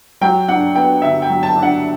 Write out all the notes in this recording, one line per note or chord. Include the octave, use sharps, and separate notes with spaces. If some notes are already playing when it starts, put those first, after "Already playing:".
F#3 G5
D4 F#5
B3 G5
D3 E5
G5
F#3
A5
D4
F#5